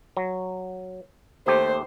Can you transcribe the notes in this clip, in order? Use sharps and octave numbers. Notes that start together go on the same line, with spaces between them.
F#3
D#2 A3 G4 C5